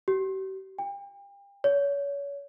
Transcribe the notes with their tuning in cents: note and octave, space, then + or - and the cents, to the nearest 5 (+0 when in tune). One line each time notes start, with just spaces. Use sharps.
G4 -45
G5 +35
C#5 +30